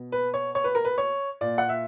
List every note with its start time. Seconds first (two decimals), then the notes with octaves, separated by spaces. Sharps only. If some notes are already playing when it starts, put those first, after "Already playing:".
Already playing: B2
0.12 B4
0.34 C#5
0.55 C#5
0.64 B4
0.75 A#4
0.85 B4
0.98 C#5
1.41 A#2 D5
1.58 F#5
1.69 E5